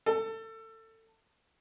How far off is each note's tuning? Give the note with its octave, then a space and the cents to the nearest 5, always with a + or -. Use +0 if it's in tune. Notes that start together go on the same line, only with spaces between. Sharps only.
A4 +25